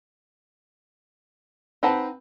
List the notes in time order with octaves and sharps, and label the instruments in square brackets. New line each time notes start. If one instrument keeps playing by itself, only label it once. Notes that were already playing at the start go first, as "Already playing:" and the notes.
[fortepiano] C4 B4 [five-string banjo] D#4 F#5 A5